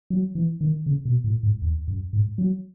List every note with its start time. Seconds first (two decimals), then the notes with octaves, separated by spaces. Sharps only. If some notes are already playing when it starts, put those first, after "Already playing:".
0.10 F#3
0.35 E3
0.61 D#3
0.86 C#3
1.05 B2
1.24 A2
1.43 G#2
1.62 E2
1.88 F#2
2.13 G#2
2.38 F#3